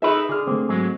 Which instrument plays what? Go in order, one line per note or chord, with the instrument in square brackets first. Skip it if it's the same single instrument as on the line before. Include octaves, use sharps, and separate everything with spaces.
[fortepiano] D#4 G#4 E5 [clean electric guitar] A4 B4 B5
[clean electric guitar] D3 D4 [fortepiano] G#4 F6
[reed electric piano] D3 A3 C4 [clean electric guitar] A#3
[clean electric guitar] G#2 F#3 G#3